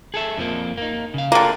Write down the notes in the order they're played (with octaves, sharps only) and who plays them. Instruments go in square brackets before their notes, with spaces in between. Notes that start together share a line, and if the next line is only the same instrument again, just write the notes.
[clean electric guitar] G#4 A4 E5
F2 F3 A#3
A#3 D#4
C#3 F5
[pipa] D3 A#3 [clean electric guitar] F4 G#4 G5